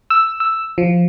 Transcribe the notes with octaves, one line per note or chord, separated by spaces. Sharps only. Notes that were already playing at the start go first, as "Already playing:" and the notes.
E6
E6
F3